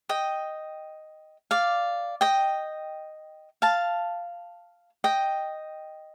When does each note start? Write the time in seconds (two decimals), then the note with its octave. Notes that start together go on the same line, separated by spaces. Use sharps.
0.09 D#5 G5
1.51 D5 F5
2.21 D#5 G5
3.62 F5 A5
5.04 D#5 G5